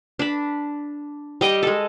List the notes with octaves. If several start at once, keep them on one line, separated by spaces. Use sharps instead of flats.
D4 B5
G3 D#5 G5
G#3 A4